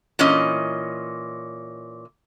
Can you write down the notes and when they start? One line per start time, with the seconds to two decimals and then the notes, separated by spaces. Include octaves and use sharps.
0.19 A#2 E3 C#4 D#5